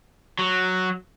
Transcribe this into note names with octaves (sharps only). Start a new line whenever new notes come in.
F#3